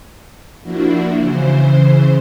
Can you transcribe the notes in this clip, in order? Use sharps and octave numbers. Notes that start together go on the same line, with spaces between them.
F3 A#3 D4 E4 F#4
C#3 E3 C5